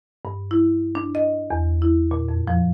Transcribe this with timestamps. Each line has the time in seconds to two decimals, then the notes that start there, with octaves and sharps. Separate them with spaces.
0.25 G2
0.51 E4
0.95 D4
1.15 D#5
1.51 E2
1.82 E4
2.11 A#2
2.28 F2
2.48 F3